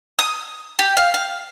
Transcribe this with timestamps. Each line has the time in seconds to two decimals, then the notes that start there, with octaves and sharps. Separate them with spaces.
0.19 D#6
0.79 G4
0.97 F5
1.14 F5